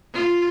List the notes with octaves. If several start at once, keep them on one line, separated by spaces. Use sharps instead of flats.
F4